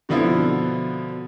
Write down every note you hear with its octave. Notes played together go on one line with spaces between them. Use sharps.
B2 D3 F3 B3 E4